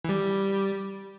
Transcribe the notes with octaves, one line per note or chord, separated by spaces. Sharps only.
E3
G3